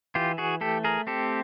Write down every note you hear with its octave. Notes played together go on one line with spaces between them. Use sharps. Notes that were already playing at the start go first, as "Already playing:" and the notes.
E3 F4 G4
F#4 G#4
A3 G4 A4
G#4 A#4
C4 G4 A4